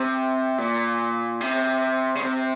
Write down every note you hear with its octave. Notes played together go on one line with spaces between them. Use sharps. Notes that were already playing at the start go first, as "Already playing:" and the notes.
Already playing: C3
A#2
C3
C#3
C3